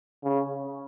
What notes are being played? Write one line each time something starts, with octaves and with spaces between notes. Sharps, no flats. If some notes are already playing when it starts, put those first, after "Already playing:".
C#3